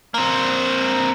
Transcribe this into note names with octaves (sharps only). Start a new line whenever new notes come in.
A#3 C4